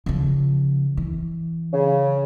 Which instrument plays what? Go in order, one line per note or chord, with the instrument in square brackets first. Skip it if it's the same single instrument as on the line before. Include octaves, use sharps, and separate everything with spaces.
[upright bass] C#3 F3
E3
[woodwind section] C#3